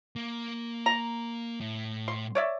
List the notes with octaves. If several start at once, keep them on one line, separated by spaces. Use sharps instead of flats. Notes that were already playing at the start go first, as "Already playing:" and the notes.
A#3
A#5
A2
C6
C#5 D5 E5